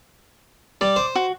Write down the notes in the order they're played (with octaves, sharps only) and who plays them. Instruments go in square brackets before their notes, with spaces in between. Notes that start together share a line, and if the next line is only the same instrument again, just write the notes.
[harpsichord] G3 [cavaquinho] D5
[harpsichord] C5
[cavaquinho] F#4